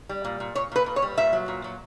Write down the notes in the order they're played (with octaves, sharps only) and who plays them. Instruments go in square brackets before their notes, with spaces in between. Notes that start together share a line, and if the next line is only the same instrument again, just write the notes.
[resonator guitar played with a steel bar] G3
A#2
A#2
A#2 C#5
A#2 B4
A#2
C#5
G3
A#2 E5
F#3
A#2
F#3